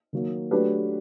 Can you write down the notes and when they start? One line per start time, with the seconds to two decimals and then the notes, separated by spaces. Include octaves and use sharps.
0.13 D#3 F#3 A#3
0.51 F#3 A3 D4 G4 B4